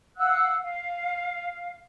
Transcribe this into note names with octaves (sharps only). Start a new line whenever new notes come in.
F5 F#5 E6 F#6
F5